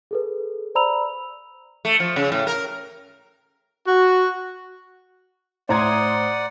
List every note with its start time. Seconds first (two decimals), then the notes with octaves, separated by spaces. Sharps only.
0.11 G#4 A4 B4
0.75 C5 D5 A#5 B5 E6 F7
1.85 A3
2.00 F3
2.16 C#3
2.32 A2
2.47 A#4
3.87 F#4
5.69 A2 C5 D5 F#5 A#5 C6 D#6 G#6